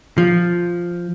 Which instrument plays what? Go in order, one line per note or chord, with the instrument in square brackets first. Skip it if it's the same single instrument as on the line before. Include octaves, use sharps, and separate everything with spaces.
[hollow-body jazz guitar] F3